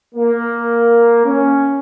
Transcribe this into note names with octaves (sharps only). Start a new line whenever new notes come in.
A#3
C#4